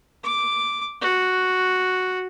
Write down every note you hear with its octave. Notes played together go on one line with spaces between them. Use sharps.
D6
F#4